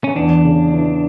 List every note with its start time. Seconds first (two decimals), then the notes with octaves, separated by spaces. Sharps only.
0.04 C#4
0.16 E2 D4
0.45 C#3
0.74 E3